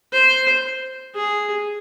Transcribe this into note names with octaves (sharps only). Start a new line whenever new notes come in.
C5
G#4